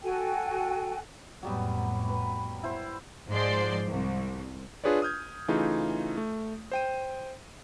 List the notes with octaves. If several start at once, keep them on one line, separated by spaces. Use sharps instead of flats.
F#4 A4 G5 G#5
F2 A2 F#3 G3 B3
B4
E4 C5
G#2 F3 G#3 C5 D5 C6
C2
D4 F4 G#4 B4 C#5 D5
D#6 F6 G6 G#6
C#3 E3 A3 D#4 F4 G#4
A3
C5 G5 D#7